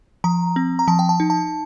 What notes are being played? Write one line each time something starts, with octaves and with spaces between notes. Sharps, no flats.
F3 A#5
C4
A#5
F3 A5
G5
A5
D#4
A5